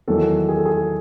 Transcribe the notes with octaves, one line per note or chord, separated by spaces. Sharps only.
E2 D#3 F#3 A4
G#4
A4
G#4